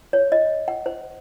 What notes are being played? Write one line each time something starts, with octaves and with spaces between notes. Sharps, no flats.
C#5
D#5
F#5
C5